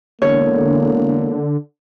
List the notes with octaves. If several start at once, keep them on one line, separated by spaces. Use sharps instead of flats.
E1 D3 A#3 C#5